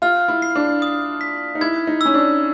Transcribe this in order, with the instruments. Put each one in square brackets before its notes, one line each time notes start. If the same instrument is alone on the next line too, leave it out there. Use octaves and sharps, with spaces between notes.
[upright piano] F4 [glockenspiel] F6
[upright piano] E4
[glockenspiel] C7
[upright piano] D4
[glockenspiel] D#6
B6
[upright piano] D#4
[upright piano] E4 [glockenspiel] G#6
[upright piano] D#4
[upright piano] C#4 [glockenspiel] E6
[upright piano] D4